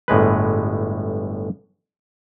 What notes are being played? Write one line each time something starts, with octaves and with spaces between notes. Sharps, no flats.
G1 A2 G#3 B4